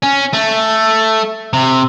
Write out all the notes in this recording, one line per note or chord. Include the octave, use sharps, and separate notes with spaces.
C#4
A3
C3